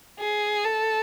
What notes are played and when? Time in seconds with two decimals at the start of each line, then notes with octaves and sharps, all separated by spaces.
0.20 G#4
0.64 A4